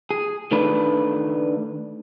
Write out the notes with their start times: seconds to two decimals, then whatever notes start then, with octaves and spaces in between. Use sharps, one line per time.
0.11 G#4
0.51 D#3 A3 D4 B4